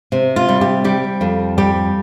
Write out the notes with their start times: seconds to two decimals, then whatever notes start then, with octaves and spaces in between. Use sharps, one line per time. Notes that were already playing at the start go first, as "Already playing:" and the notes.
0.12 C3
0.36 F4
0.48 G3
0.61 G4
0.84 G3 G4
1.21 F2
1.58 G3 G4